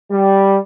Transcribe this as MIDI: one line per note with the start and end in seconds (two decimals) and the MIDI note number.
0.11 0.56 55